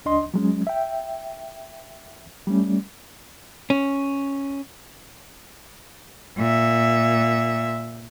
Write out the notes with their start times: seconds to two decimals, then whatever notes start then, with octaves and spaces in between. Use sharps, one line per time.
0.05 C#2 D4 D#5 C6
0.34 F#3 G#3 C#4
0.67 E5 G5
2.47 G3 A3 C#4
3.70 C#4
6.38 A#2 E5